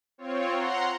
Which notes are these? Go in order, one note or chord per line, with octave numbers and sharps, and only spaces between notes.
C4 F4 C#5
F#5 A#5 C6